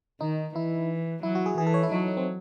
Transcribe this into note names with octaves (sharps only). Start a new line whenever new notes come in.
D#3 D#4
E3 E4
F#3 E4
F#4
G#4
E3 G#4
A4
C#5
E4
F#3 D#4
D#4
C4